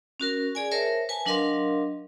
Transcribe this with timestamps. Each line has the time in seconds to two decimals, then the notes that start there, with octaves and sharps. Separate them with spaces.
0.20 C#4 F#4 A#4
0.55 G#4 D5 G#5
0.71 A#4 C5 C#5 E5 A5
1.09 B4 G#5 A5
1.26 F#3 D4 A#4 D#5 F5 C6